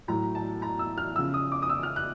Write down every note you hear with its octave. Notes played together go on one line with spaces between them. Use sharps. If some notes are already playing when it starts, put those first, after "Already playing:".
A2 F#3 A#5
A5
A#5
E6
F6
C#3 F3 E6
D#6
D6
D#6
E6
F6
F#6